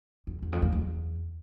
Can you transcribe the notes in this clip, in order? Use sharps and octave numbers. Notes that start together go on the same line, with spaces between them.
E2
E2
F2
E2
E2